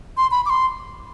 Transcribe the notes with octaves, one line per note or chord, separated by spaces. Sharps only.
C6
B5
D6
C6